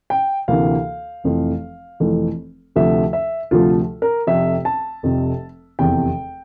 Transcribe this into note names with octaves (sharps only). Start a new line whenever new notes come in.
G5
D2 C3 E3 A#3 F5
F1 F2 E3 A3
F1 F2 E3 A3
D2 C3 F3 A3 E5
E5
D2 C3 F3 A3 F4
A#4
F1 F2 C3 E5
A5
F1 F2 C3
F1 E2 C3 G5